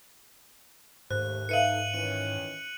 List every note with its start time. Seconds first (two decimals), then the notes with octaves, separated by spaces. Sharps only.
1.11 D#2 G#2 A3 C5 F#6
1.49 D#4 A4 B4 E5 F5 C#7 D#7 F#7
1.94 D#3 E3 C#4 D#7